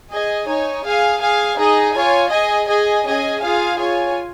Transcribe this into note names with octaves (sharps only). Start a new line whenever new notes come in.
G#4 D#5 G#5
D#4 C#5 G#5
G#4 F5 G#5
G#4 F5 G#5
D#4 G#4 D#5
F4 C#5 G#5
G#4 D#5 G#5
G#4 D#5 G#5
C#4 G#4 D#5 G#5
F4 G#4 F5 G#5
F4 C#5 G#5